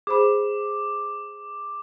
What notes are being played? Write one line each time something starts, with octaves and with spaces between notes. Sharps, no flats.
G#4 C5 B5 D6